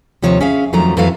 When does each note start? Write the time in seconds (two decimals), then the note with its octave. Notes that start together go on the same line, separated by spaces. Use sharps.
0.22 D#2 C3 F3 C#5
0.41 C#4 G#4 E5 F5
0.73 F2 D#3 F3 F#3 A3 A#5
0.97 F2 E3 F#3 A4 B4 F5